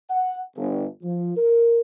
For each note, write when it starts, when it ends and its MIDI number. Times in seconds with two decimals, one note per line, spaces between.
0.10 0.40 78
0.56 0.85 31
1.02 1.32 53
1.36 1.80 70